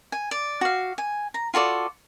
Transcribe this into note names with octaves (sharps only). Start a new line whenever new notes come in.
G#5
D5
F#4 F5
G#5
A#5
F4 F#4 A4 D5